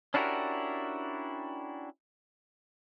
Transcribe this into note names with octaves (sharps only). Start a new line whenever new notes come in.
C#4 D4 E4 F#4 G4 A#4